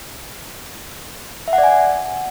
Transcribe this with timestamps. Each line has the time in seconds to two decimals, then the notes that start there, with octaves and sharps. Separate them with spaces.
1.48 E5
1.53 F#5
1.58 D5
1.64 G#5